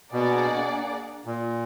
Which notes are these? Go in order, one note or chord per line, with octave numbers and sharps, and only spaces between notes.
B2 A#3 D4 G#4 D5 F#5
A#2